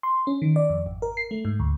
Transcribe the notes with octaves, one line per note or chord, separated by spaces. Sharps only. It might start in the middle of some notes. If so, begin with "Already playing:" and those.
C6
C#4
D#3
D5
F2
G#1
A#4
C7
A3
G#2
D2